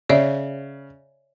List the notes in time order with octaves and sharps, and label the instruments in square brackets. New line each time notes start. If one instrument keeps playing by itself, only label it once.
[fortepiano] C#3 [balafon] C#5 D5 E5